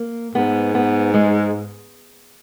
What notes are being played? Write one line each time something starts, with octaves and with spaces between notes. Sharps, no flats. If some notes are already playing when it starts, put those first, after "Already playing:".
Already playing: A#3
G#2 B3
B3
G#3